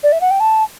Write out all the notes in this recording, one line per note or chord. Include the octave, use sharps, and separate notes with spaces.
D5
E5
F#5
G5
A5